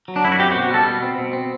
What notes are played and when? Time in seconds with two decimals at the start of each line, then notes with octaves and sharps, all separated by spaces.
0.08 F#3
0.16 D4
0.24 F#2 E4
0.32 F#4
0.39 C4 G4
0.52 F#4
0.56 B2
0.63 F#4
0.71 G3 A4
0.86 B2
1.03 C4
1.18 B2
1.33 C4